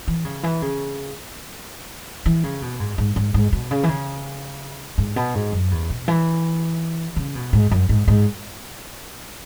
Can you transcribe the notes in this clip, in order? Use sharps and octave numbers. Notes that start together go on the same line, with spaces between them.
E3
C#3
E3
C#3
E3
C#3
B2
G#2
G#2
G#2
G#2
B2
C#3
E3
C#3
G#2
B2
G#2
F#2
E2
B2
E3
C#3
B2
G#2
F#2
G#2
G#2